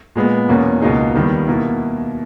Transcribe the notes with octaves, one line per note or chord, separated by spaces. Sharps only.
A#2 G#3 B3
E2 B2 A#3 C#4
C#2 B2 A#3 D#4 G#4
D#2 D#3 G3 B3
B2 A#3 E4